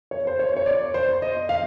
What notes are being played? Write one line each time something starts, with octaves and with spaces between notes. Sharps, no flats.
C#5
C5
C#5
C#5
D5
C5
D#5
F5